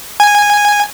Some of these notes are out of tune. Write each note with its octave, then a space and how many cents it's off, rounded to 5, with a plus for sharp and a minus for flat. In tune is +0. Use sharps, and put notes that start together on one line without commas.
G#5 -10